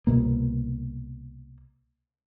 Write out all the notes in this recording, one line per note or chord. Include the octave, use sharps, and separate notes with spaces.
C2 B2 A#3